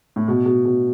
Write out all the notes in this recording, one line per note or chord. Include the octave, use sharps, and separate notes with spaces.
A2
B2
B2
B2